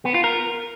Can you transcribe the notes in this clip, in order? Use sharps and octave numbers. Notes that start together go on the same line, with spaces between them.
B3
F4
A#4